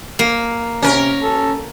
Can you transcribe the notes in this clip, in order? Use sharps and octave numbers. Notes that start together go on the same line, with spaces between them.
A#3
C3 C#4 A#4
A4